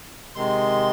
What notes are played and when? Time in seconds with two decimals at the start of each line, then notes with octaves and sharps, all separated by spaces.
0.35 C3 D#3 G#3 C6